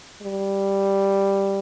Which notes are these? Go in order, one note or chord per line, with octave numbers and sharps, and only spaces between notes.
G3